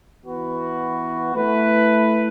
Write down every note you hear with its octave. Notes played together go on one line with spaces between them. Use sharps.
E3 B3 F#4 B4
A3 E4 B4